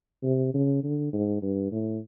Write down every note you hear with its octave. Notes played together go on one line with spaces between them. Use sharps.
C3
C#3
D3
G#2
G2
A2